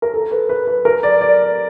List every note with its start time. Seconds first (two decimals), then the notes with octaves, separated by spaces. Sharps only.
0.02 A#4
0.14 A4
0.31 B4
0.49 B4
0.67 B4
0.85 A#4
1.03 D5
1.21 D5